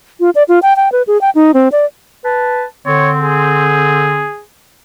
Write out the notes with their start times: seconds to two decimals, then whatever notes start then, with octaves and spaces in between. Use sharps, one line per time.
0.20 F4
0.35 D5
0.48 F4
0.62 G5
0.76 G5
0.92 B4
1.07 G#4
1.21 G5
1.35 D#4
1.54 C4
1.72 D5
2.25 B4 A5
2.86 D3 C4 C#5
3.20 G#4